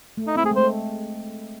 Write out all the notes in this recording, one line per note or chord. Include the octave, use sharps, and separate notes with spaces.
A3
D#4
C4 E4
A3 G#4
G#3
A3 C5